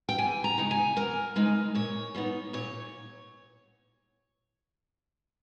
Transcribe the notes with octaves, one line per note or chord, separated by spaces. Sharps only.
G5
E2 G#5
A#5
C#3 G#3 D#4
G#5
E2 A#4
C#3 G#3 D#4
A#2 C#5
G3 B3 D#4
A#2 C#5